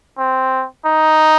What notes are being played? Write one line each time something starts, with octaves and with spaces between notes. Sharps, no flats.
C4
D#4